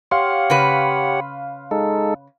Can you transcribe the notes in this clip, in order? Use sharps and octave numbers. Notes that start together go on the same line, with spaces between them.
G4 C#5 F5 F#5 C6
C#3 B4
G#3 D#4 A4